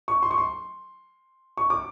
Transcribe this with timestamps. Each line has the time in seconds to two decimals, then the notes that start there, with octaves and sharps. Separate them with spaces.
0.08 C#6
0.23 C6
0.31 C#6
0.38 C6
1.57 C#6
1.70 D6